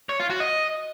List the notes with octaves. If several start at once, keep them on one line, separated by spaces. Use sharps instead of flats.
C#5
F4
F#4
D#5